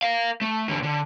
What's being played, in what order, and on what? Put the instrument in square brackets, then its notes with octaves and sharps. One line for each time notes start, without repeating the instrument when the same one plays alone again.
[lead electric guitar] A#4 F5
A3
E2 D3
D3